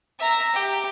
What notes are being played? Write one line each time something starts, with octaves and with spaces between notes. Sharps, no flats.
E5 A#5
G4